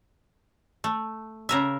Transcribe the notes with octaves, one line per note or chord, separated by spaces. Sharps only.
A3
C#3 A#4 E5